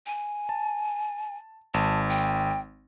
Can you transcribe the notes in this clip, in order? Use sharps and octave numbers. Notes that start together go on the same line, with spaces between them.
G#5
A5
G#1 A5
G5